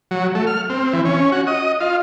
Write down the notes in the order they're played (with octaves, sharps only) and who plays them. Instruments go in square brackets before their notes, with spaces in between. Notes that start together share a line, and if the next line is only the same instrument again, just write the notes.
[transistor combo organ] F#3
A3
F6
C4
E3
C#4
F#4
D#5
F4